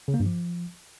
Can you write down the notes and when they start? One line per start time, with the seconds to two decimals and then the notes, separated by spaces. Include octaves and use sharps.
0.08 C#3
0.14 A#3
0.20 G2
0.26 F3